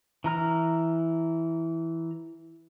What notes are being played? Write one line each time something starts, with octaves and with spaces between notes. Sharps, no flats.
E3 A#5 F6